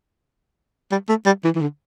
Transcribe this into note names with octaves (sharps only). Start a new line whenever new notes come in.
G3
A3
G3
E3
E3
D3